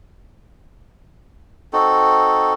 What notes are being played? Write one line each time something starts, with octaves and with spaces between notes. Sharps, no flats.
C4 D#4 F#4 A4